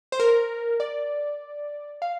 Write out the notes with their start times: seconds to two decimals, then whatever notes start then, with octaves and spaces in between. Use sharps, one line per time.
0.12 C5
0.20 A#4
0.80 D5
2.02 F5